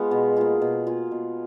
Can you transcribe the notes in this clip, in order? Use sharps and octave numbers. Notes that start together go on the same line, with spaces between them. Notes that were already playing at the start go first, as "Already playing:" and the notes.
Already playing: G#3 B3 F4
B2
A#3 F4 G#4
B2
A#3 F4 G#4
B2